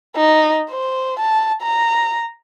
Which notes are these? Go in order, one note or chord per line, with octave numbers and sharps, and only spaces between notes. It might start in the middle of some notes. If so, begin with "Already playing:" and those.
D#4
C5
A5
A#5